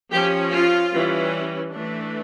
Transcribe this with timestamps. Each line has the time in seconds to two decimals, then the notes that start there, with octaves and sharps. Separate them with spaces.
0.12 F3 C#4 G4
0.53 F4
0.92 E3 G3 C#4
1.72 E3 A3 D4